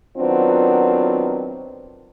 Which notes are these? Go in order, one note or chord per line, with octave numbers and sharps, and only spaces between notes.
D#3 F#3 B3 C4 D4 F4